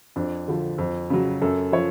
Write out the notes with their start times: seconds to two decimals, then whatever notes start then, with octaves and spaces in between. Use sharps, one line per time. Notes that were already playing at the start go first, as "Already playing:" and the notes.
0.16 F2 D4
0.48 D3 F3
0.78 F2
1.10 C#3 F#3
1.42 F#2 A4
1.72 F3 C#5